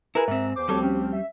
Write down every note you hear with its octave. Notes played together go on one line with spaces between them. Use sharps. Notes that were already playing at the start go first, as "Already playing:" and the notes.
E4 G#4 A#4 B4
G#2 C4 E5
E2 E3 C5 D6
D2 F3 G3 C4 F#4 A4 C#5
C#4 G4
E5